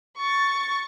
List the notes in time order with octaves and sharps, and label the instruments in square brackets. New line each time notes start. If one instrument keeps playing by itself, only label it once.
[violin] C#6 A6